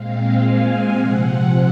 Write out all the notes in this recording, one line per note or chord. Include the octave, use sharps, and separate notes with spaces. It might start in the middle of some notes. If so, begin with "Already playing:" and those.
Already playing: A#2 G#3 C4 F5
G#5
C3 F3 C4 F#5